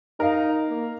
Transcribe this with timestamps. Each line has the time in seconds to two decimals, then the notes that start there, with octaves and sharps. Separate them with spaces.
0.20 D#4 A#4 F5
0.68 A#3